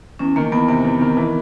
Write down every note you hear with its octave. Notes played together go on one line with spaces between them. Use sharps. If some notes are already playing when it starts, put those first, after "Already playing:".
E2 C#4
D#3 A#3
E2 B3
C3 B3
E2
D#3
E3